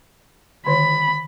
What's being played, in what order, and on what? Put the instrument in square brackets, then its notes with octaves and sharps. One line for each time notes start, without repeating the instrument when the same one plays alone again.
[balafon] D3 D#3 C#5 [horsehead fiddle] B5